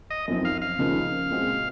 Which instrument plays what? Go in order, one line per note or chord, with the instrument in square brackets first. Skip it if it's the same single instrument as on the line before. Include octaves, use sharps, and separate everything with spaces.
[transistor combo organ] D#5
[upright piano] F#2 F3 C4 D#4
[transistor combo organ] F5
F5
[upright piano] C#2 C#3 F3 A#3 D#4
A#2 G#3 C4 F#4